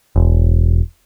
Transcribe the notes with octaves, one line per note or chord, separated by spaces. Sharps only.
E1